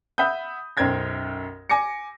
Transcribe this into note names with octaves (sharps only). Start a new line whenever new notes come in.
E5 F#5 B5 D#6 G6
B1 F#2 C5 G5 G#6 A#6
G#5 D6 A#6 C#7